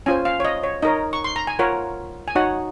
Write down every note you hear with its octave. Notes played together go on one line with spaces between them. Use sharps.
C#4 F4 C5 G#5
F5
C#5
D#5
C#5
D#4 A#4 C#5 D#5
C#6
C6
A#5
G#5
F4 A#4 C#5 F#5
G#5
D#4 F#4 C#5 F#5